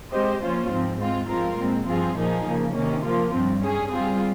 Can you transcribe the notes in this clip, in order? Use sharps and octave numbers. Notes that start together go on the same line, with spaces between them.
G#3 C4 G4 C5 D#5
F3 A#3 C#4 F4 C5
G#2 F3 C4
G#3 C4 F4
F3 G#3 C4 F4 A#4
A#2 G#3 C4
G2 F3 C4 F4 G#4
A#2 F3 A#3 D#4 G#4
C#3 F3 A#3
C3 D#3 A#3 C#4
F3 A#3 F4
G2 F3 C4
G3 C#4 G#4
G3 C4 F4 G#4